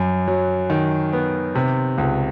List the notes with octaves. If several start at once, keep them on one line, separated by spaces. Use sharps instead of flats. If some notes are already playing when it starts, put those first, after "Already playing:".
Already playing: F#2
F#3
D#3
B3
C3
C#2